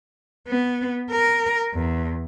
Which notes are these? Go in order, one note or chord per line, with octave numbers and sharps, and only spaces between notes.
B3
A#4
E2